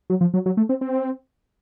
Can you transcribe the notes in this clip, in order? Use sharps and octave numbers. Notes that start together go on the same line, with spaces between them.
F#3
F3
F#3
F#3
A3
C4
C4